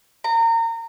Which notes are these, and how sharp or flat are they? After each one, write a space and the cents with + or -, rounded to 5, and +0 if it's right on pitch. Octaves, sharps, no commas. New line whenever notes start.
A#5 -30